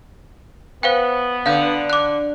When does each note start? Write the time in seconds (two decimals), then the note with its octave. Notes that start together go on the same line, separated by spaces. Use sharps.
0.83 B3 C5 F5 G5
1.46 D3 F5 G6
1.90 D6 F#6